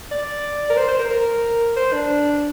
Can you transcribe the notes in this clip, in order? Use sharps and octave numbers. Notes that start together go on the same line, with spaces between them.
D5
A#4
C5
C5
A#4
A#4
C5
D4